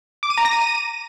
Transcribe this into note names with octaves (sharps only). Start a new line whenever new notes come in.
D6
D#7
A#5
A#6
D#7